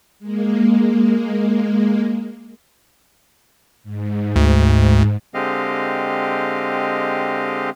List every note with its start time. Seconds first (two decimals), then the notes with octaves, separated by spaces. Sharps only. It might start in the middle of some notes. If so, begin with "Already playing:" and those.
0.19 G#3 A#3
3.84 G#2
4.36 D2
5.34 D3 G#3 C4 G4 D#5 F5